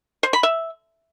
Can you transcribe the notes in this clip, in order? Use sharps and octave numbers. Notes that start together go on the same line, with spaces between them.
C5
B5
E5